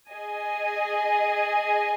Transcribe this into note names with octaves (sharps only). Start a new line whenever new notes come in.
G#4 D#5 G#5